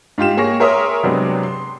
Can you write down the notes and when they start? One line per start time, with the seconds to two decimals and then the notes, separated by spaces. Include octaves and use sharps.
0.18 G#2 F4 G4 E7
0.37 A#3 G#4 C#5 C#6 A#6
0.60 G#4 A#4 C#5 E5 C6 D#6
1.03 C3 F#3 G#3 B3 C4 D4
1.43 C6